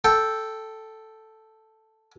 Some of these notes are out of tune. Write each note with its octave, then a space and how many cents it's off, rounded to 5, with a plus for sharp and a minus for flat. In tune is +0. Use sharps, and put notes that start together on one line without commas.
A4 +0 G5 +0